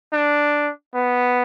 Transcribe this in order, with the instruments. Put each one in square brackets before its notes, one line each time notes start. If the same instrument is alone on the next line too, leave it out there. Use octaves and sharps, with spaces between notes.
[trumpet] D4
B3